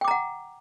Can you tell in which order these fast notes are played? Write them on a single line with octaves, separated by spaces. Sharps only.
G5 D6 A#5 F#5